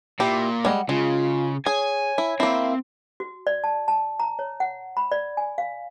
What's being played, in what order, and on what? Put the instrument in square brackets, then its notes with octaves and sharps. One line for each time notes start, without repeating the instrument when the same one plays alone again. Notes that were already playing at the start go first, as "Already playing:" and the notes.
[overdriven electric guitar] A#2 [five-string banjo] E4 G4
[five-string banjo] G3 G#3 [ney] F#5
[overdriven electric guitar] C#3 [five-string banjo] G#3 [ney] F4
[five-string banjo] G#4 [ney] C#5 [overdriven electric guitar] G#5
[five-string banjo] E4
[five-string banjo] A#3 E4 [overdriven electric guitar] C4
[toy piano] F#4
D5
A5
A5
A#5
C#5
F#5
B5
D5
G#5
F5